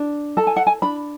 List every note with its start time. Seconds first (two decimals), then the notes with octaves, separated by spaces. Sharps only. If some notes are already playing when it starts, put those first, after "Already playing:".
Already playing: D4
0.37 A4 A5
0.47 G#5
0.56 F#5
0.67 G#5
0.82 D4 B5